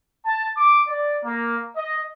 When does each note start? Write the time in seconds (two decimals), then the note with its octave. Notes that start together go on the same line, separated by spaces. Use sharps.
0.24 A5
0.56 D6
0.87 D5
1.24 A#3
1.76 D#5